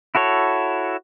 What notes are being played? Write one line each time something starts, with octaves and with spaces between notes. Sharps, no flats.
E4 F#4 A4 C#5